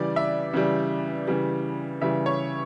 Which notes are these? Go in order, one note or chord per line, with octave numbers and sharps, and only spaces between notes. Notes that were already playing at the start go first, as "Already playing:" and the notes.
Already playing: C#3 E3 G3 D5
E5
C#3 E3 G3
C#3 E3 G3
C#3 E3 G3 E5
C#5